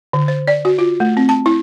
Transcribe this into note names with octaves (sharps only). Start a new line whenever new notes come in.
D3
C5
D5
F#4
F4
A3
C4
A5
E4